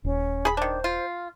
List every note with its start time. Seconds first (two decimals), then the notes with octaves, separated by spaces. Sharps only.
0.05 D#1 C#4
0.45 G#4 B5
0.57 D#3 D4 C5
0.84 F4